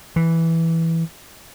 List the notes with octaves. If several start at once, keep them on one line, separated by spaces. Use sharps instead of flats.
E3